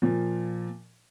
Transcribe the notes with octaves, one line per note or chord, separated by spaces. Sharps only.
A#2 F3